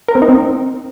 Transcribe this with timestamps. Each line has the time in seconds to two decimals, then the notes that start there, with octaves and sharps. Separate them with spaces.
0.08 A#4
0.15 C4
0.22 D#4
0.29 C4